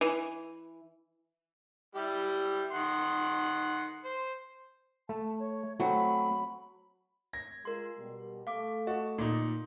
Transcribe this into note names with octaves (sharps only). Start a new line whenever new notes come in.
E3
G3 E4 G4
D#3 F#5 C6
C5
A3 A5
C#5
F#3 A3 C4 B5
G#6 A#6
G#3 F4 A#4 C6
B2 G3
A3 F5 D6
F#4 D#5
A#2 D#4